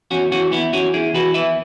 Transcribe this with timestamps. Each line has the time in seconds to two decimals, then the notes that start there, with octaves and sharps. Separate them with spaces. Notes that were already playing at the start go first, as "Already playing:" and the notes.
0.11 E2 C#4 F#4
0.31 E3 C#4 F#4
0.52 E2 B3 E4
0.73 E3 C#4 F#4
0.94 E2 E4 G#4
1.14 E3 F#4 B4
1.34 E2 B4 E5